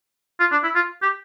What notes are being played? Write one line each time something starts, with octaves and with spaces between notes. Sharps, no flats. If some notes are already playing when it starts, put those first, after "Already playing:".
F4
D4
E4
F4
G4